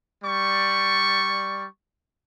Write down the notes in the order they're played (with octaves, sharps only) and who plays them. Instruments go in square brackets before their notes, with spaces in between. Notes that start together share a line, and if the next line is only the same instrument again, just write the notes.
[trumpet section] G3 D5 C#6